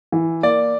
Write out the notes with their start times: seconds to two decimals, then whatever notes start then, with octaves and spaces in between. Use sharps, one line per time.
0.12 E3
0.43 A#3 D5